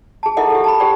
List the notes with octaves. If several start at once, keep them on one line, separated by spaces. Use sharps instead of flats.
G#4 A5
E4 A4 A#4 D#5 E5 F#5
G4 A4
A5 B5
G4 G#4 C5 D5 G5